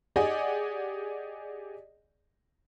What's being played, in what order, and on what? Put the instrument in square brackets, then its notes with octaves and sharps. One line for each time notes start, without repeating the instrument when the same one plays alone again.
[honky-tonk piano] G4 G#4 D5 D#5 F#5 G#5